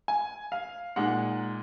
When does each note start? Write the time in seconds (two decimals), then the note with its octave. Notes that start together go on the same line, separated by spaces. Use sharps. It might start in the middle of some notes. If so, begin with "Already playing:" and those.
0.08 G#5
0.52 F5
0.96 A#2 G#3 D#4 F#5